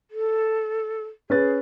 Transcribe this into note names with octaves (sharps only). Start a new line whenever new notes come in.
A4
C#4 G#4 B4 A6